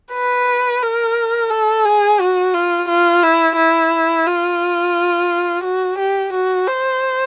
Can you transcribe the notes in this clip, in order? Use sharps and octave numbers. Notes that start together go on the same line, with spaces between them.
B4
A#4
A4
G#4
F#4
F4
F4
E4
E4
F4
F#4
G4
F#4
C5